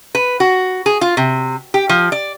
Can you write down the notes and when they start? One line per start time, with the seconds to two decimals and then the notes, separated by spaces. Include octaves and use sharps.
0.15 B4
0.40 F#4
0.86 G#4
1.01 F4
1.17 C3
1.74 G4
1.89 F3
2.12 D5